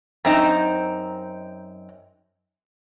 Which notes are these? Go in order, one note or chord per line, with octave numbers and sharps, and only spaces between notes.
F#2 C4 D#4